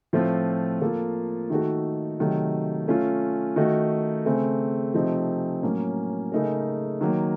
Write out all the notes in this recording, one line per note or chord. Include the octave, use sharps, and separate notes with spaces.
A2 F3 A3 C4 F4
F3 A#3 F4 A4
D#3 A3 D#4 F#4 A4
C3 D#3 F#3 A3 D#4
A3 C#4 F4
D#3 A3 D#4 F#4
C#3 A3 C4
C3 F3 A3 C4 D#4
A2 F#3 A#3 C#4
C#3 A3 D#4 A#4
D#3 F#3 A#3